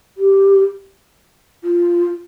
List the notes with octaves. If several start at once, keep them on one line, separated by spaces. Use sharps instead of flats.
G4
F4